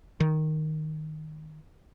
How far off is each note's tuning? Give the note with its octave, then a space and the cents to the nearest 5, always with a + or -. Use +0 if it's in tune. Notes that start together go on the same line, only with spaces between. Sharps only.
D#3 -5